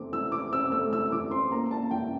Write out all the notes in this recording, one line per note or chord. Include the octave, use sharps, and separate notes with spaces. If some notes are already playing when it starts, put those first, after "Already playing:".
Already playing: E3 A3 C4 D6
E3 E6
E3 D6
C4 E6
A3 E6
E3 E6
E3 D6
C4 C6
A#3 A#5
A#3 A5
E3 G5